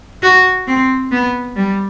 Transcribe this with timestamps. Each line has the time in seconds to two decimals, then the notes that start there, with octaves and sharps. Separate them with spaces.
0.23 F#4
0.67 C4
1.12 B3
1.56 G3